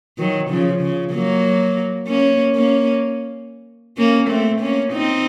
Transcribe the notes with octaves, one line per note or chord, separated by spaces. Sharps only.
D#3 F#3
C#3 F3
C#3
F#3 A#3
A#3 C#4
A#3 C#4
A#3 C#4
A3 C4
A#3 C#4
C4 D#4